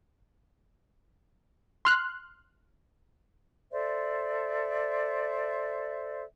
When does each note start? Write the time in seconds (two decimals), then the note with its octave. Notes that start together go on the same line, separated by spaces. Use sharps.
1.85 C6 F6 F#6
3.73 A4 C5 D5 E5